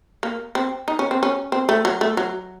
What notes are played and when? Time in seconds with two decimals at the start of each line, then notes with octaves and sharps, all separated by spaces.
0.23 A#3
0.55 C4
0.88 D#4
0.99 C#4
1.11 C4
1.23 C#4
1.52 C4
1.69 A3
1.85 F#3
2.01 A3
2.17 F#3